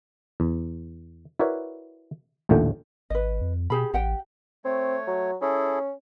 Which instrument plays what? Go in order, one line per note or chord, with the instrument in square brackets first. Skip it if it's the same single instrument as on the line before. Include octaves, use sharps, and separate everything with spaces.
[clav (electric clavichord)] E2
E4 F#4 A#4 B4 C#5 D5
A1 D#2 A#2 D3 A3 G5
[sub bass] G#1 [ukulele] B4 D#5
[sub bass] F2
[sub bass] B2 [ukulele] G4 G#4 B5
[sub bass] A1 [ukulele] G4 F#5 G5
[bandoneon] A3 C#5 [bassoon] C4
[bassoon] F#3
[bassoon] C#4 [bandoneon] E4 G#4 A4